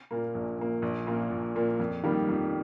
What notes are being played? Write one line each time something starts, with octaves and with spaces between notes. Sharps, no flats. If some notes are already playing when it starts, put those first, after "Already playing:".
A#2 A#3
A#1
A#2 A#3
A#1
A#2 A#3
A#1
A#2 A#3
F2
D#3 G3 A#3
F2